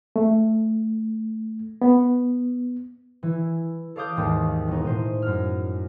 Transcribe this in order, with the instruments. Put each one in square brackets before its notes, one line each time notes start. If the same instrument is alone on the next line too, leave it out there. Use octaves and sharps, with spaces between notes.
[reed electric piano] A3
B3
[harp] E3 E4
A4 C#5 F5 D6 D#6 G6
G#1 D#2
E1 D#4
A2 C5 D#7
F#2 F6